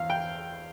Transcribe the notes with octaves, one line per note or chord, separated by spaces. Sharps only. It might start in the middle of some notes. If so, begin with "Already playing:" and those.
Already playing: E2 F5
G5